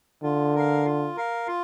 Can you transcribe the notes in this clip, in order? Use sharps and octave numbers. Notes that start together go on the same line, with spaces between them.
D3 F4
A#4 F5
F4
A#4 F5
F4